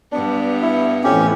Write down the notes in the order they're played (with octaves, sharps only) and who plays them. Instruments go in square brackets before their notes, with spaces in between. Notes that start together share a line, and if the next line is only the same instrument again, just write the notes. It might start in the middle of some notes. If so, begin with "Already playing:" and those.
[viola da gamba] G2 B3 [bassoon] D4
[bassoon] E4
[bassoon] F2 [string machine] A2 E3 [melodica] C#4 G4